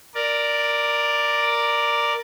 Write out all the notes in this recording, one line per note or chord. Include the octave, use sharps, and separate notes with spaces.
A#4 D5